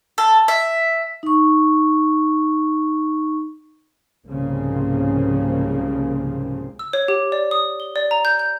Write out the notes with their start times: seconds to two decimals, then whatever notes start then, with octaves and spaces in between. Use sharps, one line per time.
0.18 A4
0.48 E5
1.23 D#4 C#6
4.28 C2 G#2 C#3 F3 A#3 C4
6.79 E6
6.93 C#5
7.08 G4
7.32 D5
7.51 D#6
7.80 G7
7.96 D5
8.11 A#5
8.25 G6
8.39 G6